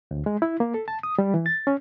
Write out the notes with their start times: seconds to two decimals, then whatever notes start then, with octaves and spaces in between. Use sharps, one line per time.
0.11 D2
0.26 G#3
0.42 E4
0.60 A#3
0.74 A4
0.88 A5
1.03 D#6
1.19 G3
1.34 E3
1.46 A6
1.67 C#4